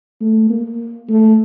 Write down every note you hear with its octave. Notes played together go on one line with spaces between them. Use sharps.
A3
A#3
A3